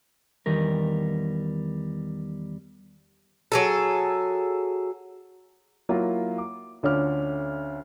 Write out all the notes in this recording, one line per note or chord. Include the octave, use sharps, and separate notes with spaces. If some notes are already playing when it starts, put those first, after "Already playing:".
E2 D#3 G3 A#4
F#3 G#4 A4
F#3 A#3 E4 F4
D6
D2 D3 C#4 F4 D6 F6